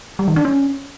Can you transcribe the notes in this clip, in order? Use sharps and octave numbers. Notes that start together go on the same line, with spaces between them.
G3
D#3
D4
C#4